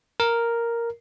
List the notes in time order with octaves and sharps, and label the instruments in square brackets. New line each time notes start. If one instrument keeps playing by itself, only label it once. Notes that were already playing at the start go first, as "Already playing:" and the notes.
[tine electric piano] A#4